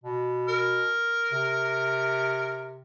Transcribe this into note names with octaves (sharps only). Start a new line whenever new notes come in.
B2
A#4
C3